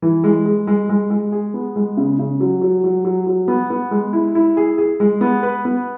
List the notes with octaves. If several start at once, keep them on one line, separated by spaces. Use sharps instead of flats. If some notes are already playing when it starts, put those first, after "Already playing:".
E3
G#3
G#3
G#3
G#3
G#3
G#4
B3
G#3
C#3
C#3
F#3
F#3
F#3
F#3
F#3
B3
B3
G#3
E4
E4
G#4
G#4
G#3
B3
B4
B3